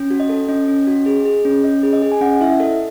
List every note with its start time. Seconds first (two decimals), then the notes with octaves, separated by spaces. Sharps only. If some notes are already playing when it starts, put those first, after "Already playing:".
Already playing: C#4
0.11 F#4
0.20 D#5
0.29 A4
0.49 C#4 D#5
0.68 C#4
0.87 F#4
1.06 G#4
1.25 G#4
1.45 C#4
1.64 C#4 D#5
1.83 G#4
1.93 D#5
2.02 G#4
2.12 G#5
2.21 C#4 F#5
2.41 E4 E5
2.60 A4 D#5